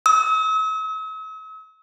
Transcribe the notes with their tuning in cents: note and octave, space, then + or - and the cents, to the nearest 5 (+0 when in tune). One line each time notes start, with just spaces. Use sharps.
E6 -45